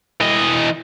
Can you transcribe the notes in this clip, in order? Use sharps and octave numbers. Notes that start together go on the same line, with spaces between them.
E3 D#5